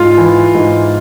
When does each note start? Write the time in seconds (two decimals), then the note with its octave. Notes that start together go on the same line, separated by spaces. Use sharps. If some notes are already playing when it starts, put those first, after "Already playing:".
Already playing: G#2 F4
0.17 E3
0.55 G#2